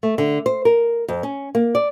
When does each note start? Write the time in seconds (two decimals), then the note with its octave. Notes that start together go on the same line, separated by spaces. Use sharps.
0.03 A3
0.18 D3
0.46 C5
0.65 A#4
1.08 F2
1.23 C#4
1.55 A#3
1.75 D5